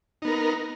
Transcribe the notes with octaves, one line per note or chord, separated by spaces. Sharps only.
B3 D#4 A#4